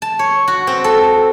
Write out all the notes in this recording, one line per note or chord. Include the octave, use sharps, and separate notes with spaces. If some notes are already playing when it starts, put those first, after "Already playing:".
A5
C#5
F#4
C4
A4